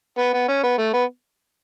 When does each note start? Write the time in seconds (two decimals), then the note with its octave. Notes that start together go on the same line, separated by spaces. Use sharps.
0.18 B3
0.34 B3
0.48 C#4
0.63 B3
0.78 A3
0.94 B3